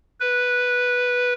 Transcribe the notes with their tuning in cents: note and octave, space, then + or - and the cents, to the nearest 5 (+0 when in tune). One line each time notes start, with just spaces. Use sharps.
B4 -5